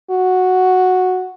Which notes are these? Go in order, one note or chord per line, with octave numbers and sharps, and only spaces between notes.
F#4